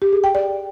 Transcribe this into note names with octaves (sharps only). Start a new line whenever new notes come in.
G4
G#4
G5
D5